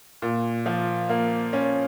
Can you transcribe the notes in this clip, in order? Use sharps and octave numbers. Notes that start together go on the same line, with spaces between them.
A#2
F3
A#3
C#4